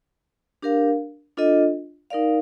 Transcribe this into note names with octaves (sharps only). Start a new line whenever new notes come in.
D4 G4 A#4 F5
D4 F4 A4 D#5
D#4 A#4 D5 F5